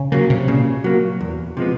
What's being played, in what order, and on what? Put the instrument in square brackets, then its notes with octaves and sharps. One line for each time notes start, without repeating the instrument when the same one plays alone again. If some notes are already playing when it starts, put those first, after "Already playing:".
Already playing: [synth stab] C#3
[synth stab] C#3 [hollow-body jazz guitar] F#3 A#3
[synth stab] C3
[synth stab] A#2 [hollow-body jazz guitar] C#3
[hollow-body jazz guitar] F#3 A#3
E2
C3 F3 G#3 B3